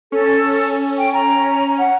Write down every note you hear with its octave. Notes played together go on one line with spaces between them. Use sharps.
C#4 A4
G5
A#5
F#5